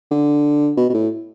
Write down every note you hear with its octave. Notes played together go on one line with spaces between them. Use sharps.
D3
B2
B2
A2